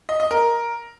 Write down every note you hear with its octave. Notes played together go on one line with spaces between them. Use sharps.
D#5
D#5
A#4